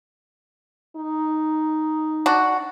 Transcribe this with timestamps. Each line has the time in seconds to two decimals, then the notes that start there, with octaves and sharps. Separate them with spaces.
0.96 D#4
2.26 D4 F#4